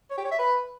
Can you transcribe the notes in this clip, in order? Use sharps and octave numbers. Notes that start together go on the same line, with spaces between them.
C#5
G4
C#5
E5
B4